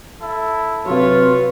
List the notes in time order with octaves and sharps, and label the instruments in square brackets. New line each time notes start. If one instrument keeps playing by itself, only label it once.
[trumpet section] E4 A4
[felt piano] C3 F#3 [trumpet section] F4 [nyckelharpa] B4 C#5